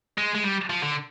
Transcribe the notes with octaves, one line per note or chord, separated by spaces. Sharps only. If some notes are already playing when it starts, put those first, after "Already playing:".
G#3
G#3
G3
F3
D3